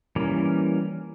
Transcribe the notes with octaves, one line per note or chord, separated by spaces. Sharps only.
E3 G3 A#3 C#4 A#4